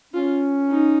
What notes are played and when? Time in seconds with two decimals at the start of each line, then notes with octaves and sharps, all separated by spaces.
0.14 C#4 F4
0.69 D#4